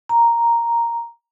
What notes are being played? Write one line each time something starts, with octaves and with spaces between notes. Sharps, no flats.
A#5